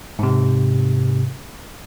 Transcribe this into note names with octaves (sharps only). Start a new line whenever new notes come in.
G#2 C3